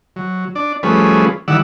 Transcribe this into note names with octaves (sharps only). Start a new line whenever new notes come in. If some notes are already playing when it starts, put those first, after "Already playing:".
F#3
D4 D5
F3 G3 A3 C#4 G#4 B4
D#3 E3 G3 D5 F#5 E6